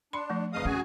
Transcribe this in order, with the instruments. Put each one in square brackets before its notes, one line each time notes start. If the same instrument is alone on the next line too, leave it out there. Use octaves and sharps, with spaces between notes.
[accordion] D4 [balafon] B5 [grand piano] C6 C#7
[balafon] F3 A3
[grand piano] G1 F2 G#3 [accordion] D#5 F5 D#6
[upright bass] C#4 [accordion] F#4 G#4 G#5